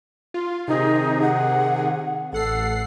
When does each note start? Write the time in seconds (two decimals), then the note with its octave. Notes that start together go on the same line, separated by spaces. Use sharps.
0.34 F4
0.68 C3 D#3 D#4 G#4
1.22 F#5
2.33 A1 A4 F#5 C7